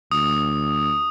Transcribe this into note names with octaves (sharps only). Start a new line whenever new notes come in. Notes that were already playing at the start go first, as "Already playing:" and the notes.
D2 D#6